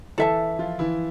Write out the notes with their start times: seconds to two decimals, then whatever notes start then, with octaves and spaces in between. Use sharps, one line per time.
0.18 E3 E4 A4 E5 A5
0.59 F3 F4
0.79 E3 E4